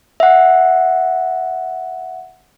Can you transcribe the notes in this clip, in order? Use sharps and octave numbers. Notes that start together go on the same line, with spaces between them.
E5 F#5